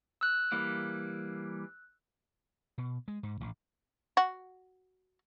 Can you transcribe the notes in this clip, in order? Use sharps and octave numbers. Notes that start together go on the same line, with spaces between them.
E6 F#6
E3 G3 A#3
B2
G#3
G#2
A1
F#4